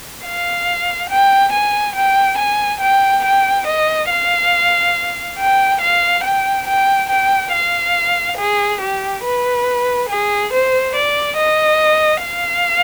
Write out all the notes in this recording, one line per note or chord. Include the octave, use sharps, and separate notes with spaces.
F5
G5
G#5
G5
G#5
G5
G5
D#5
F5
G5
F5
G5
G5
G5
F5
G#4
G4
B4
G#4
C5
D5
D#5
F5